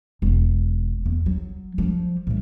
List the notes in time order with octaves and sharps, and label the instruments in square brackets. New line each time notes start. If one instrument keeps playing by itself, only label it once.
[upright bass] E1
E2
F#3
F3 G3
A2 G3